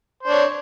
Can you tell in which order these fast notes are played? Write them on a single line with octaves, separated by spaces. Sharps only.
C5 D4 C#5